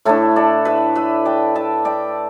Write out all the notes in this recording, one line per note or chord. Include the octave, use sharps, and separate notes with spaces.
A2 A3 D4 E4 A4
A4 D5
B4 E5
B4 E5
D5 G5
E5 A5
D5 G5